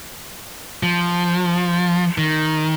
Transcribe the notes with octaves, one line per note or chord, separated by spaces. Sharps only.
F3
D#3